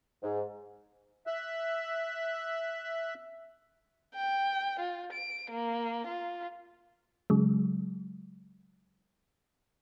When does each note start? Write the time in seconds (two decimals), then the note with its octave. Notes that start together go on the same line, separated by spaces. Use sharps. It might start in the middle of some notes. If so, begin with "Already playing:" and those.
0.23 G#2
1.27 E5 E6 F#6
4.15 G5
4.80 F4
5.13 D7
5.51 A#3
6.07 F4
7.30 C#3 F#3 G#3